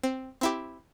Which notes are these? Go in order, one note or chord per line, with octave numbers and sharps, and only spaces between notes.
C4
C4 E4 G4